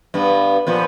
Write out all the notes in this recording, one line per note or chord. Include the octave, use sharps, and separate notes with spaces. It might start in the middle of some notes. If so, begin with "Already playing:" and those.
G2 B3
A#2 F3 B3